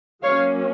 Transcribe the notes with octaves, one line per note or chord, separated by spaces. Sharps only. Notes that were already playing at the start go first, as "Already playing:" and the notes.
F#3 A#3 C#4 C#5 F5